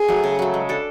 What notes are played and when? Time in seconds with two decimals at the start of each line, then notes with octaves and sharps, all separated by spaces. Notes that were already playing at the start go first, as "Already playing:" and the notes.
Already playing: G#4
0.08 F#3 A3
0.24 C#3
0.39 F#3 A3
0.54 G#3
0.69 D4 A4